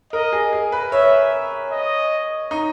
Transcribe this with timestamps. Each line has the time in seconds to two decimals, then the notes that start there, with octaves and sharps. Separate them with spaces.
0.13 A#4 D#5
0.33 G#4
0.53 G#4
0.72 B4
0.92 C#5 E5
1.71 D#5
2.51 D#4